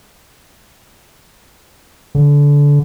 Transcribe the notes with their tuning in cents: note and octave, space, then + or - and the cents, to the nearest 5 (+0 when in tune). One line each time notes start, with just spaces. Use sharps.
D3 -25